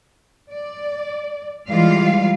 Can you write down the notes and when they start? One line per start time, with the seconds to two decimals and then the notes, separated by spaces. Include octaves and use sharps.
0.50 D5
1.69 E3 G3 G#3 F4 F5